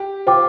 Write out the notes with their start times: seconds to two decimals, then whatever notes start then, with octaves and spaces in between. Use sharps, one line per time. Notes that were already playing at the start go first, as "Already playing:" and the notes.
Already playing: G4
0.27 F4 C5 G5 D6